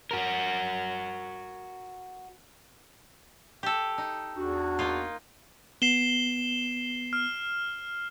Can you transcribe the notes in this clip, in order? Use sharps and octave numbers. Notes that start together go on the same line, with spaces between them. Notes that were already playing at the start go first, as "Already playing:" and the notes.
F#4 A#4
G4 A4
D#4
E2 D4 F#4
A#3 D#4 F4
B3 C7 E7 G7
F6